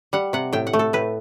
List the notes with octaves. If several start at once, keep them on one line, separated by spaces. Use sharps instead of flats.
G3 F#5
C3 F#5
A2 G5
F#5
A3
A4
A2 B4